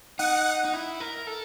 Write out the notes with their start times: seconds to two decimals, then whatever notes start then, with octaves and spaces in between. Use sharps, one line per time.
0.19 D#4 F#5
0.65 D#4
0.74 E4
1.00 A#4
1.27 A4